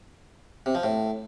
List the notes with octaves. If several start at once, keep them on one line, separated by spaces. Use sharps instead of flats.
C3
F3
A2